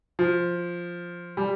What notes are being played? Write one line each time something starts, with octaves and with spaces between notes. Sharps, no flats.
F3
G3